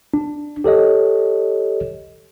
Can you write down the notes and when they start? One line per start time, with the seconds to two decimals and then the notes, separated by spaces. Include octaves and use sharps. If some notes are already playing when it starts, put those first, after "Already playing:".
0.14 D4
0.64 G4 A4 C#5 D#5